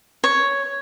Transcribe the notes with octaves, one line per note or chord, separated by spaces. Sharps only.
C#5